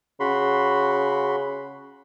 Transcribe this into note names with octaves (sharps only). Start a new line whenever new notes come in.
C#3 F#4 B5 C6